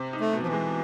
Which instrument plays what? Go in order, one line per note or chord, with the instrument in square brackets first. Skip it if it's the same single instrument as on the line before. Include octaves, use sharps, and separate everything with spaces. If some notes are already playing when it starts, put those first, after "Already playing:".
Already playing: [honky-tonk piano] C3 C4
D#4
[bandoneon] A3
[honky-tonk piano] B2
[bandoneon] F3
E3
[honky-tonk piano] G#3